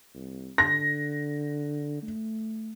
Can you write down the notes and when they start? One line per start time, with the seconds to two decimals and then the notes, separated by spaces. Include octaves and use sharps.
0.14 C2
0.58 D3 A#6
2.02 A3